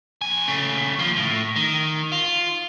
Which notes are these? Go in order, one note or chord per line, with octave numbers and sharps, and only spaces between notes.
F2 G#5
C#3 A3
D#2 F3
A2
D#3
F4